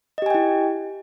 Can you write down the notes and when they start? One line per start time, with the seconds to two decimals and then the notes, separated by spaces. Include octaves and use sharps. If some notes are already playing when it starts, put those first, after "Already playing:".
0.18 D#5
0.22 G4
0.26 G#5
0.30 G5
0.35 E4